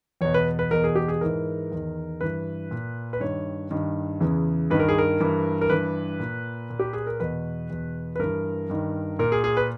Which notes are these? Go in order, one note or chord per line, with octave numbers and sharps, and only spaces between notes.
E2 B2 C#5
B4
B4
E2 B2 A#4
G#4
G4
G#4
G#2 E3 A#4
E2 D#3
G2 E3 B4
A#2
B4
G2 D#3 C#5
G2 D#3
E2 C#3 E3
G2 D#3 B4
A#4
G#4
A#4
G2 E3
A#4
G2 E3 B4
A#2
A#2
G4
G#4
A#4
E2 B2 B4
E2 B2
B4
G2 E3 A#4
G2 D#3
A#2 A#4
G#4
G#4
B4